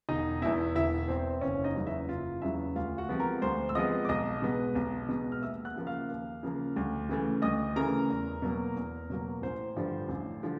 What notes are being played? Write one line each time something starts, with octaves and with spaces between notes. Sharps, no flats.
E1 D#4 D#5
E2 B2 E4 E5
E1 E4 E5
E2 B2 C4 C5
F#1 C#4 C#5
D#4 D#5
E2 C#3 F#3 B3
E4 E5
F#1 F4 F5
E2 C#3 F#3 B3 E4 E5
D2 F4 F5
F#4 F#5
C3 F3 G#3 B3
A#4 A#5
D2 C5 C6
E6
C3 F3 G#3 B3 D#5 D#6
D6
B1 D#5 D#6
B2 G#3 B3
B1
B2 G#3 B3
F6
D#2 E5 E6
F#5 F#6
C#3 F3 A#3
F5 F6
D#2
C#3 F3 A#3
D2
C#3 E3 A3
D2 D#5 D#6
C#3 E3 A3 A#4 A#5
E2
B2 F#3 A#3
E2
B2 F#3 A#3
A1 C5 C6
G2 D3 F3
A1
D3 F3